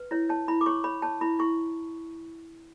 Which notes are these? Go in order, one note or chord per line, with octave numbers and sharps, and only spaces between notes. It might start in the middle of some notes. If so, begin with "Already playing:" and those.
Already playing: B4
E4 C#5
C#5 A5
E4 B5
D6
C#5 C#6
C#5 B5
C#5 A5
E4 B5
E4 C#6